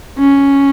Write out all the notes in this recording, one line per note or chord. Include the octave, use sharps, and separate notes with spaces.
C#4